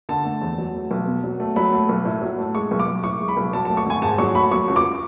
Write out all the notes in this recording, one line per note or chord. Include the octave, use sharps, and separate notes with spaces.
D3 A5
A3
E2
F#3
A3
B1
B2
F#3
A3
F#3 B5
A3
B1
A2
F#3
A3
G#3 C#6
B1
D6
B1
A2 C#6
G#3
B5
B1
F#3 A5
A5
A3
C#6
G#1 G#5
G#2 A5
F#3 C#6
A3 B5
F#3 C#6
C#2
D6